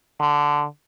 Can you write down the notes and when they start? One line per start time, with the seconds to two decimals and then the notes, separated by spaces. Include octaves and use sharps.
0.20 D3